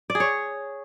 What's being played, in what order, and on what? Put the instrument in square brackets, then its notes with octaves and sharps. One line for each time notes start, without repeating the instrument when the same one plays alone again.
[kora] D5
G#4
C#5